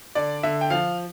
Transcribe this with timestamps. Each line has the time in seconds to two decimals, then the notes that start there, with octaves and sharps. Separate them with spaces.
0.15 D3 D5
0.43 D3 E5
0.61 G5
0.70 F3 F5